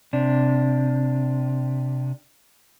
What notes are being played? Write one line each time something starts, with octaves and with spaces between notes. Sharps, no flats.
C3 D4